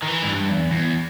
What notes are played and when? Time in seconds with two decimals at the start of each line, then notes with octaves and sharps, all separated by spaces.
0.02 D#3
0.08 E3
0.23 G#2
0.28 G2
0.50 E2
0.72 E2